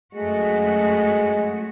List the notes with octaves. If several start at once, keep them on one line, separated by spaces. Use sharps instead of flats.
F#2 G#3 A3 F#4